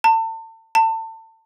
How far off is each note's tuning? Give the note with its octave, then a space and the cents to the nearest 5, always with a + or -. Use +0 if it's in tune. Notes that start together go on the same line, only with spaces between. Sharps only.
A5 +35
A5 +30